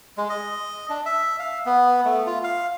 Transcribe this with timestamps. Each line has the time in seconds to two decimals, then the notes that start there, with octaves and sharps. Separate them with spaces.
0.17 G#3
0.29 D#5
0.90 D4
1.06 E5
1.39 F5
1.66 B3
2.05 A3
2.26 F4
2.44 F5